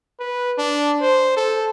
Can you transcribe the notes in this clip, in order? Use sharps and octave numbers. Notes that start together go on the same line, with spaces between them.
B4
D4
C5
A4